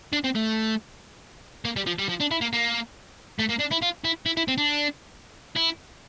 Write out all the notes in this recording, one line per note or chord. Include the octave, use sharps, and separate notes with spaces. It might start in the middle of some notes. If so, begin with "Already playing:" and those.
D4
C4
A3
A#3
G3
F3
G3
F3
D4
E4
A#3
A#3
A3
A#3
D4
E4
F4
E4
E4
E4
C4
D4
E4